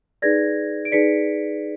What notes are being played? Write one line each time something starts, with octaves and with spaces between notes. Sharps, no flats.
D#4 G#4 B4 D5 G#6 A#6
D7
D#4 G#4 B4 D5 B6 C#7